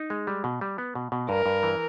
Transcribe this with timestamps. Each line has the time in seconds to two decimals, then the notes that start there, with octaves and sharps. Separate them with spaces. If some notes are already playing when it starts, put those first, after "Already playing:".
Already playing: D#4
0.10 G#3
0.27 G3
0.44 B2
0.61 G3
0.78 B3
0.95 B2
1.12 B2
1.29 G2 A#4
1.46 G2
1.63 E3